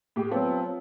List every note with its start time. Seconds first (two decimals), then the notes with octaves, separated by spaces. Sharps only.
0.16 A2 G4 G#4
0.32 F3 F#3 B3 C4